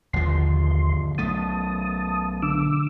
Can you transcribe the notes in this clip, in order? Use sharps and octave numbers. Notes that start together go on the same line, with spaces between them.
G1 D#2 F3 C6
B1 A3 A5 D#6
D3 D6 E6